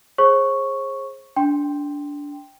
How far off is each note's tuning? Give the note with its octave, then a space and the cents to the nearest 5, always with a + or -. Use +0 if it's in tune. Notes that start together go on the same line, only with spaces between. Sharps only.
G#4 +0 C5 +40 C#6 +0
D4 -15 G5 +0 C6 +5